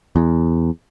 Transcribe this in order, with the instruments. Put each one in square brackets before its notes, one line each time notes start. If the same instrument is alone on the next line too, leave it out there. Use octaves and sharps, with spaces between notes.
[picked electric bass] E2